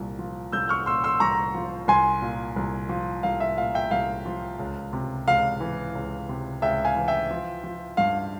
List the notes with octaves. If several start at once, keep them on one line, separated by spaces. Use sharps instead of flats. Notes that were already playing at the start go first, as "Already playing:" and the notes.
Already playing: C2 A#2
F3
C2 E6 G6
C#6 F6
A#2 C6 E6
C6 E6
C2 A#5 C#6
F3
C2 G#5 C6
A#2
C2
F3
C2 F5
E5
A#2 F5
E5 G5
C2 F5
F3
C#2
C3
C#2 F5
E3
C#2
C3
C#2 E5 G5
F5 G#5
E3
E5 G5
F3
F3
G2 F5